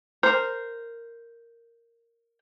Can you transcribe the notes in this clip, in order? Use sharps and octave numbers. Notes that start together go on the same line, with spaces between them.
A#4 C5